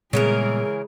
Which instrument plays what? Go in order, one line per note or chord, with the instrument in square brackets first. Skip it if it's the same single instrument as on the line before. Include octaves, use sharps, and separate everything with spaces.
[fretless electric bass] A#2 G3 B3 [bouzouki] C#3 E3 A#4 [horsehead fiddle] G#3 G#4